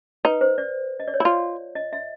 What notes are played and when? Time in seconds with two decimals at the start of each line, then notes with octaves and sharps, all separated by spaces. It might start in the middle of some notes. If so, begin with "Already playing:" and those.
0.25 D#4 B4
0.41 C5
0.58 D5
1.00 D#5
1.08 D5
1.14 C#5
1.20 E4 F4 D5
1.75 D#5
1.93 E5